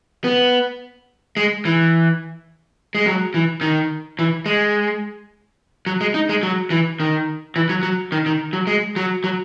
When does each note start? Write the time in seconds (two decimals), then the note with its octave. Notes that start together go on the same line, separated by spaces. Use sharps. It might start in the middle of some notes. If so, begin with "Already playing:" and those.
0.24 B3
1.37 G#3
1.65 E3
2.95 G#3
3.06 F#3
3.34 E3
3.61 D#3
4.19 E3
4.46 G#3
5.87 F#3
6.01 G#3
6.14 D#4
6.29 G#3
6.43 F#3
6.70 E3
7.00 D#3
7.56 E3
7.69 F#3
7.83 F#3
8.12 D#3
8.26 D#3
8.53 F#3
8.67 G#3
8.96 F#3
9.24 F#3